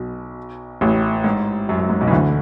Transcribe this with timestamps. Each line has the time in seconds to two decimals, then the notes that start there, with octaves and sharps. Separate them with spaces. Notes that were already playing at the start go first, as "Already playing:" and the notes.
Already playing: B1 B2
0.81 A1 A2
1.24 G#2
1.69 F#2
1.80 F#2
1.90 G#2
2.01 B1 B2
2.07 E3
2.11 D2 D3